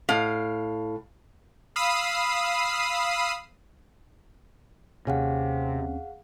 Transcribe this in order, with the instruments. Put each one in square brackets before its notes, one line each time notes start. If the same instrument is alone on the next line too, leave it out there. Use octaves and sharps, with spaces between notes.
[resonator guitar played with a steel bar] A2 F5
[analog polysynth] F5 B5 D#6 E6 C7 D#7
[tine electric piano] D#2 C4 C#4 [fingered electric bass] C3 [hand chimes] G#4 F5 F#5